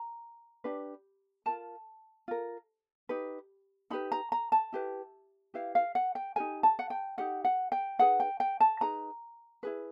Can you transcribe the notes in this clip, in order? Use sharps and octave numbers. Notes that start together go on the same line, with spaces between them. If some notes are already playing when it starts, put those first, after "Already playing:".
Already playing: A#5
D4 G4 B4
F4 A#4 A5
F4 A#4
D#4 G4 B4
D#4 G4 B4 B5
A#5
A#5
A5
E4 G4 B4
E4 G4 B4 F5
F5
F#5
G5
D#4 G4 A#4 G#5
A5
F#5
G5
D#4 G4 A#4 F#5
F#5
G5
D#4 G#4 B4 F#5
G5
G5
A5
D#4 G#4 B4 A#5
E4 G#4 B4